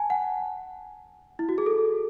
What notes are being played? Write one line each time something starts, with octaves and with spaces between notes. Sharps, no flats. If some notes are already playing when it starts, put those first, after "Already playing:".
Already playing: G#5 A5
F#5
E4
F#4
G#4
A4